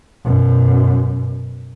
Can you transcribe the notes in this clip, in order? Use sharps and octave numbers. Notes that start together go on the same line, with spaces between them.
F#2 B2